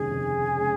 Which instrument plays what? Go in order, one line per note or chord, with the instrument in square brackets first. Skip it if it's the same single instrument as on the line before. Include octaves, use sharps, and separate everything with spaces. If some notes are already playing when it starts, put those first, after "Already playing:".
Already playing: [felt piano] F1 D#2 C#3 G#3 [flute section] G#4
[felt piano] F1
C#3 G#3